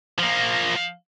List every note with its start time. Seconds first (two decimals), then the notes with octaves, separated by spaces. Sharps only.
0.19 F3 A#3